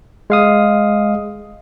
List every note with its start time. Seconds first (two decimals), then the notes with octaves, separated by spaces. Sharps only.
0.30 G#3 F5 D#6